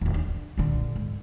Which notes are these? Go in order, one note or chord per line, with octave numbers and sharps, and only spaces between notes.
D#1 A1
D4
A#1 D3
G#2